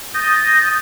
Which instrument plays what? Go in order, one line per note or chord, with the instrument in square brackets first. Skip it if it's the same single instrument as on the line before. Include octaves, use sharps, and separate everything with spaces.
[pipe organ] D#6 G6 A6 A#6